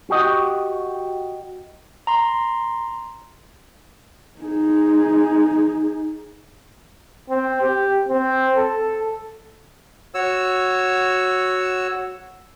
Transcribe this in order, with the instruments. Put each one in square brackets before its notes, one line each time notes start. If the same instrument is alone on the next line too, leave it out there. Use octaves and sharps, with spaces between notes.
[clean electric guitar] F#4 G4 D#5
[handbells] A#5 C6
[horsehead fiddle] D#4 G#4
[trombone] C4
G4
C4
A4
[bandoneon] F#4 C#5 E6